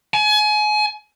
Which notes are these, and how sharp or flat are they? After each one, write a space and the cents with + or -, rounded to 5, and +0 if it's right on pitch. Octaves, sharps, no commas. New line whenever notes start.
G#5 +30